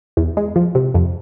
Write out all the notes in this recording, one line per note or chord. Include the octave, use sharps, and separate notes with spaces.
E2
G#3
F3
C3
F2